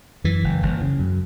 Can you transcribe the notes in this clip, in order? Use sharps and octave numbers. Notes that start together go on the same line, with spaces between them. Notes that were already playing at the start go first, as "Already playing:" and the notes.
F#2 E3
F#1
F#1
C#3
F#2